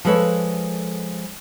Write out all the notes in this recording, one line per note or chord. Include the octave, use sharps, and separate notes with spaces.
F3 G#3 A4 B4 C#5